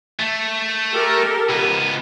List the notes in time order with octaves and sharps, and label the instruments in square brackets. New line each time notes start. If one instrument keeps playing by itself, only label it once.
[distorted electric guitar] A3
[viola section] G4 A4 A#4
[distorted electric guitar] C#2 B3